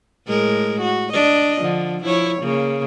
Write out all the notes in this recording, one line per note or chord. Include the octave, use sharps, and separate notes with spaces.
A2 G#3 A#4
F#4
D4 D#5
D3 F3
F3 E4 C#5
C#3 A#3